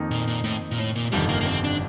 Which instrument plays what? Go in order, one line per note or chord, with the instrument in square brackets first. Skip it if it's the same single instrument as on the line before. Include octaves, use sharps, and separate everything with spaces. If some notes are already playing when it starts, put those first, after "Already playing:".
Already playing: [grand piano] F2 D#3 A#3 D#4
[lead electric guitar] A#2
A#2
A2
A#2
A2
A#2
[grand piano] G1 F2 C3 D#3 [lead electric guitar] G3
[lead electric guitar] A#3
A#3
C4
D4